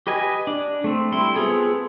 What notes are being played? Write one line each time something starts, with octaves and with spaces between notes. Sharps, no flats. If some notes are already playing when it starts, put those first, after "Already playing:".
G4 B4 D#5 G#5
D4
A3 C4
G3 E4 C6
B3 C4 F4 G#4 A4